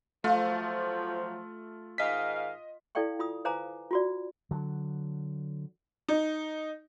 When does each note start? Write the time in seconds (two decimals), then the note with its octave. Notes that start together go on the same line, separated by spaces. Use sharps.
0.24 F3 F#3 A3 F4
1.98 G#2 D#3 D#5 F5 B6
2.95 E4 A4 D5 F5 G5 C#6
3.19 F4 B5 D#6
3.45 B4 C5 F5 G#5 A#5 D6
3.91 F4 F#4 D5
4.51 D3 F#3
6.08 D#4